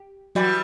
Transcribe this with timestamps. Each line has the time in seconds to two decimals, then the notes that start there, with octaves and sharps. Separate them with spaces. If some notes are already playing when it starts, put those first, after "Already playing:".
Already playing: G4
0.35 E3 F#3 G3 F#4